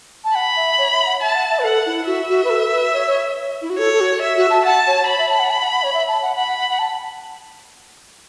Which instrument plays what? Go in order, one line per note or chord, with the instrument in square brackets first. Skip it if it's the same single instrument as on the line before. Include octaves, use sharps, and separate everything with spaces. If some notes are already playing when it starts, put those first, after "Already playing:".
[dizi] A5
[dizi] F#5 [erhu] B5
[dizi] E5
C#5
E5
F#5
[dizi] E5 [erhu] A5
[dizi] F#5
E5
B4
[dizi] A4 [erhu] F#5
[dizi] E4
[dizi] F#4 [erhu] E5
[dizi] F#4
B4
A4
B4
C#5
C#5
E4
F#4
[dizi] A4 [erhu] C#5
[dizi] A4
F#4
[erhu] E5
[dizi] F#4
A5
[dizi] F#5 [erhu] A5
[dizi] C#5
[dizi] C#5 [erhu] B5
[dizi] E5
A5
F#5
A5
F#5
F#5
C#5
E5
A5
F#5
[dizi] F#5 [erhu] B5
[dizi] F#5
F#5
F#5
A5